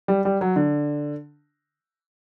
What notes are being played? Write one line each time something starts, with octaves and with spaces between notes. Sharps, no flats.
G3
G3
F#3
D3